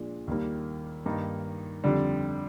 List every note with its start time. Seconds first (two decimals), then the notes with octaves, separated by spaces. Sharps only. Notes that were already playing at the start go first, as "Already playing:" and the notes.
Already playing: A#2 F3 G#3 D4
0.27 D#2 D#3 G3 A#3
1.06 G2 D#3 A#3 D#4
1.84 F2 D3 G3 D4